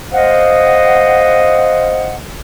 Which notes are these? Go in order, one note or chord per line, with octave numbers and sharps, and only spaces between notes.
C5 D#5 F5 F#5